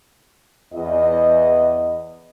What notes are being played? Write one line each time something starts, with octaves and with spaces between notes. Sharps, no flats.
E2 D#5